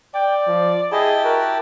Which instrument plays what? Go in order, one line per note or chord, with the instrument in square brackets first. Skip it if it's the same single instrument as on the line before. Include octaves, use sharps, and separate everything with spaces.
[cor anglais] D5 [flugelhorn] G5
[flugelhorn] F3
[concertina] E4 G4 A5 [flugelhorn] G#4 [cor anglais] D#5
[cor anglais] F#4 [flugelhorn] A#4